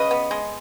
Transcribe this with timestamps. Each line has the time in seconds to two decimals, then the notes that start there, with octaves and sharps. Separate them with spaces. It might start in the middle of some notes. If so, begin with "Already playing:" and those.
Already playing: C#3 B4 D#5
0.11 B3
0.31 G#3